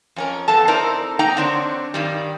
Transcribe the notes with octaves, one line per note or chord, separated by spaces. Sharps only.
F2 C#4 A#4
F2 B3 A4 A5
C4 D#4 E4 A4 A#4 D5
A#3 D#4 G5 A#5
D3 C4 D4 C#5
G2 D#3 G3